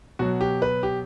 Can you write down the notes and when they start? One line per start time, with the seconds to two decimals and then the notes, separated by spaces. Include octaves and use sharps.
0.19 B2 F#3 F#4
0.41 G4
0.62 B4
0.83 G4